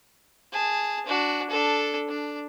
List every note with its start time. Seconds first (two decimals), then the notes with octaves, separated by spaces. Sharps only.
0.52 G#4 A5
1.05 D4 F#4
1.49 D4 A4
2.08 D4